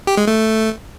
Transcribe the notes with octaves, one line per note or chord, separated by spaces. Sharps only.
G4
G#3
A3